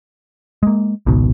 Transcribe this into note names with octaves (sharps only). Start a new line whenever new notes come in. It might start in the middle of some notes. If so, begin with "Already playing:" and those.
G#3 A#3
G#1 C#2 B2 D#3